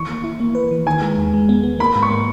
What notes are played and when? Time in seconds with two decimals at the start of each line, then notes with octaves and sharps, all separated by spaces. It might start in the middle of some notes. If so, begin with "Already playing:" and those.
Already playing: D#3 E3 C#6
0.09 A#3
0.24 E4
0.40 A#3
0.55 B4
0.71 E3
0.86 D#3 G#5
1.02 G#3
1.18 E2
1.33 G#3
1.49 B3
1.64 B3
1.79 A#3 B5
1.96 G#2
2.03 C#6
2.11 A#3